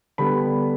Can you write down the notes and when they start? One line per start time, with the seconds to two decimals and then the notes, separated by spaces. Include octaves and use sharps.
0.18 D3 G3 B3 B5